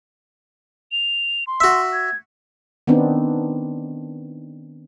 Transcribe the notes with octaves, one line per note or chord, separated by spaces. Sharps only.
F7
C6
F#4 E5
G#6
D#3 B3 C4 D4 D#4